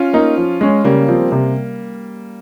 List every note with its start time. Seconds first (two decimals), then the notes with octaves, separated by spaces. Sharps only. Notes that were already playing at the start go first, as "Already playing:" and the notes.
Already playing: C#4 F4
0.13 A#3 D#4
0.37 F3
0.61 G#3 C#4
0.84 C#3 G3 A#3
1.08 F3 C4
1.32 C3